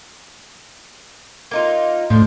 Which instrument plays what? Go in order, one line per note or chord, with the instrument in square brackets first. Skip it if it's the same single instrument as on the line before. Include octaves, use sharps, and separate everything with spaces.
[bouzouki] A#3 D#4 F4
[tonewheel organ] A2 [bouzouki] F3 D4 C5